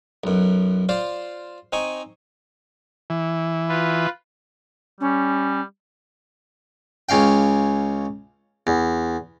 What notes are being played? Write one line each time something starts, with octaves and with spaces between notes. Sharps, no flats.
B1 F#2
F4 C5 D5
C4 D#4 G#5 C#6
E3
F4 B4
G3 C#4
C#2 C#4 F5 G5
E2